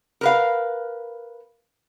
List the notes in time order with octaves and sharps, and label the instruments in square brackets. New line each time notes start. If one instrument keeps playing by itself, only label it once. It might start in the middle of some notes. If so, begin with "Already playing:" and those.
[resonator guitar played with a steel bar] A#4 B4 F5